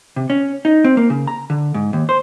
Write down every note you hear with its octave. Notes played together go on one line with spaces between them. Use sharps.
C3
C#4
D#4
C4
A#3
C#3
A#5
D3
G#2
D#2
C5